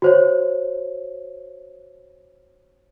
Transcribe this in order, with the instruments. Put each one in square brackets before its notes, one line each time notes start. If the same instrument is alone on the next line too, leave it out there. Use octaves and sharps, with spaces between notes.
[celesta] F#4 C5 C#5